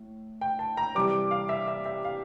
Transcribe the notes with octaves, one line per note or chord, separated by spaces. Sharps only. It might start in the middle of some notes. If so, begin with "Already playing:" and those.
Already playing: A2
G5
A5
A#5
C3 E3 G3 D6
F5
E5
E5
E5
F5